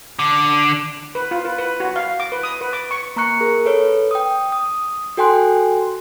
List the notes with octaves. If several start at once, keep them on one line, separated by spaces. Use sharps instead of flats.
D3
B4
F4
B4
B4
F#4
F5
D6
B4
D#6
B4
D6
C#6
A#3 A#5 C#6 F#6 C#7
G#4 A#4
A4 B4 C#5
G5 D#6
D#6
F#4 A4 G5 G#5 C6 F#6